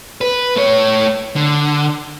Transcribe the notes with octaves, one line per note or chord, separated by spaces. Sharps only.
B4
A3 C#5
D3